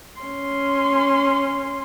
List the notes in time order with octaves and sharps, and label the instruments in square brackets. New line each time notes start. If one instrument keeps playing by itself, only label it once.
[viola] C#4 C6